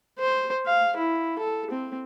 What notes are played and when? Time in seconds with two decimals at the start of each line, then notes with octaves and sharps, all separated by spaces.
0.19 C5
0.66 F5
0.97 E4
1.39 A4
1.71 C4